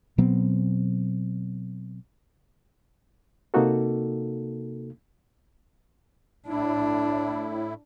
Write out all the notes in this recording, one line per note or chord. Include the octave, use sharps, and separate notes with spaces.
B2 F#3 B3 C4
C3 A#3 D#4 F#4 A4
A2 D4 E4